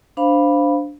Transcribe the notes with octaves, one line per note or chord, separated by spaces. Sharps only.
D4 C5 F5 B5